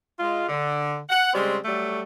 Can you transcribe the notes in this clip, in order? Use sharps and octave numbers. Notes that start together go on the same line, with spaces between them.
G#3 F4
D3
F#5
C#3 G3 G#3 C4
F#3 G3 A3